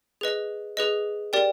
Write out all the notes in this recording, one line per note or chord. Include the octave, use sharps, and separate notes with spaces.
G#4 B4 D#5
G#4 B4 D#5
G4 A#4 D5 G5